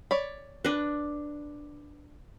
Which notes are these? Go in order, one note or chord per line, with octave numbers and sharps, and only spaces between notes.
C#5 D5 B5
D4 B4